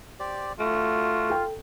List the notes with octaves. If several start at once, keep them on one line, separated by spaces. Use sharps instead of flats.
G4 C5 D5
A3 F4 F#4
A4 G5